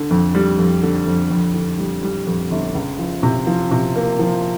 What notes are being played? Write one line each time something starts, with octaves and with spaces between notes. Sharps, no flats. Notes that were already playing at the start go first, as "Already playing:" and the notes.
Already playing: D3
F2
G3
F2
D3
F2
F2
D3
G3
G3
F2
G1
C#2
F3
C3
F3
C3
A#3
F3